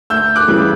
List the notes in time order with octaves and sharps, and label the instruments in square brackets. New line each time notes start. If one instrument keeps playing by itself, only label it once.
[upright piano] D2 E6 G6
D6 F#6
C#3 E3 G3